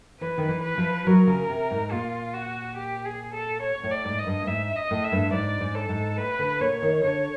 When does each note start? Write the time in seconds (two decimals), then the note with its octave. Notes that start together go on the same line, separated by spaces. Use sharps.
0.21 E3 B4
0.38 D#3
0.49 E3
0.63 B4
0.78 F3
1.07 F#3 A#4
1.27 C#3
1.49 C3
1.71 G#2
1.92 A#2 F4
2.34 F#4
2.77 G4
3.05 G#4
3.34 A4
3.62 C#5
3.83 A2
3.91 D5
4.05 G#2
4.19 D#5
4.27 G2
4.41 A2
4.47 G#2 E5
4.76 D#5
4.91 A2
5.04 E5
5.12 G2
5.33 G#2 D5
5.61 G#2
5.76 A4
5.89 G#2
6.18 A2 B4
6.39 D3
6.60 A#2 C#5
6.82 D#3
7.04 D3 C#5